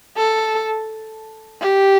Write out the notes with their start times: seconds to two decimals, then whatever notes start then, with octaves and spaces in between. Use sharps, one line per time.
0.17 A4
1.61 G4